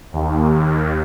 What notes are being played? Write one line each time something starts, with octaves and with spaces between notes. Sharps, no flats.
D#2